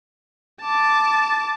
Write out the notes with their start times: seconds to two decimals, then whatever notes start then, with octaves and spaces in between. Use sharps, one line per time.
0.62 A5 D6